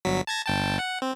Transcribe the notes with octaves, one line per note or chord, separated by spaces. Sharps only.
G1 F#3 B6
A5 G#6 A#6
G1 G5 A5
F#5
C4